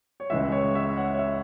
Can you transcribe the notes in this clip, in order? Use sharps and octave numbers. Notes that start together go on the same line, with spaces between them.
C#5
C#2 C#3 E3 G#3 E5
C#5
E5
C#5 F#5
C#5
E5